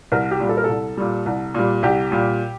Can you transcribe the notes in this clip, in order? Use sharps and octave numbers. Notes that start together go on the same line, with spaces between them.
C2 A#4
G4
A#2 G3
A4
A#4
C2 A4
A#2 G3
C2
A#2 G3
C2 G4
A#2 G3